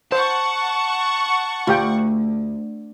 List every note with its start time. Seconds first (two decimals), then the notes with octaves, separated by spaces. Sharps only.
0.12 C5 F#5 A5 C#6
1.67 D2 F4 G4 G5